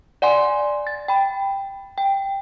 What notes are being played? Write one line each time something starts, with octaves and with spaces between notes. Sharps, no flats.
D5 F#5 G#5 C6
A6
G5 B5
G5